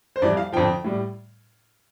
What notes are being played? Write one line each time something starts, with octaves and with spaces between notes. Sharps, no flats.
C5
F2 E3 G3 D5
F5
F2 D3 F3 G5
A2 G3